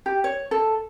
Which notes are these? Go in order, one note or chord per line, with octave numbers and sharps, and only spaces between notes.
G4
C#5
A4